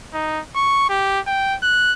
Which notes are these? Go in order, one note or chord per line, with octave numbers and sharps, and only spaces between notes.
D#4
C#6
G4
G5
F#6